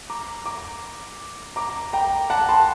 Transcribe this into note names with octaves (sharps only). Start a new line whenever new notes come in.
A#5 D6
A#5 D6
A#5 D6
G5 A#5
F#5 A5
A5 C6